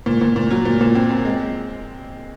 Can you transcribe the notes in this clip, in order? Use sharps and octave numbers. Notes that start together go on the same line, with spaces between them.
A#2
A#2
A#2
F#3
A#2
A#2
C4
C4
G#3